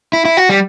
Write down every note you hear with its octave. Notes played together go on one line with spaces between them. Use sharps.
E4
E4
F#4
G3